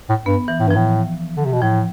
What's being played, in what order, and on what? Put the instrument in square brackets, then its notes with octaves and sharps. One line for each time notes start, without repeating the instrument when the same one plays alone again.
[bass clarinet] A2
[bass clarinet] G2 [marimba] B3
[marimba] E3
[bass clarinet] A2
[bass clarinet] G2 [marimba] F3
[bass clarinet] A2
D3
C3
B2
[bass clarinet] A2 [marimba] F3